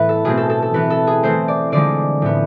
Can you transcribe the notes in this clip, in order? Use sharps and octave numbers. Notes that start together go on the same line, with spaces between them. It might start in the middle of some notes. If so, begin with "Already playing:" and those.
Already playing: A2 E3 B3 B4
A4
B2 A3 C4 G#4
A4
A4
A4
E3 B3 B4
A4
G#4
E3 A3 C4 C5
D5
D3 F3 G#3 D5
A2 F3 B3